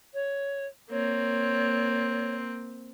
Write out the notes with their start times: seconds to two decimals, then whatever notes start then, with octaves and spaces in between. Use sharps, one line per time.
0.13 C#5
0.90 A#3 C4 C#5